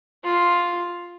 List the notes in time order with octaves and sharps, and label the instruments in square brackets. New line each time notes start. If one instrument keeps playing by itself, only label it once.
[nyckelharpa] F4